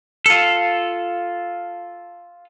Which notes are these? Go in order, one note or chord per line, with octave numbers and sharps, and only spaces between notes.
F4 A4